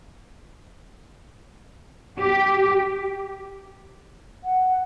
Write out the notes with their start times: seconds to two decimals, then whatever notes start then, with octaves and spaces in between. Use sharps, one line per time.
2.20 G4
4.44 F#5